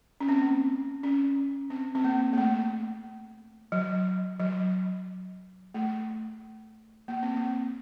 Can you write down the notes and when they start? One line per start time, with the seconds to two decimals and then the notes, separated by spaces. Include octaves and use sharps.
0.20 C#4
0.29 C4
0.37 A#3
1.03 C#4
1.70 C4
1.95 C4
2.04 A#3
2.33 A#3
2.38 A3
3.72 F#3
4.40 F#3
5.74 A3
7.08 A#3
7.23 C4
7.36 A#3